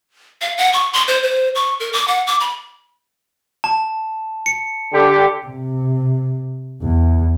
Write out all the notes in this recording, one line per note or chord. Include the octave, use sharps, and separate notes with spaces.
F5
F#5
C#6
C6
C5
C5
C#6
A#4
D6
F#5
D6
B5
A5
C#7
D3 G4
C3
E2